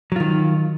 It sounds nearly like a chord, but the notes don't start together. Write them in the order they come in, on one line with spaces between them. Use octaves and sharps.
F#3 F4 D#3